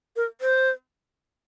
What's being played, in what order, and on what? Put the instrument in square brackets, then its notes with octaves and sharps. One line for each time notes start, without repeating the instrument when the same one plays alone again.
[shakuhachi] A#4
C5